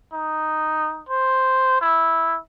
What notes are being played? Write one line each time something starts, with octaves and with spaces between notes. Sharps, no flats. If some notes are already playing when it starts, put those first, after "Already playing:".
D#4
C5
E4